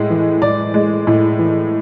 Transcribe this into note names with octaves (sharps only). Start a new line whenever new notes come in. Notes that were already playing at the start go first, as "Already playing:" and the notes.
Already playing: A2 G#3
E3
A2 D5
G#3
A2
E3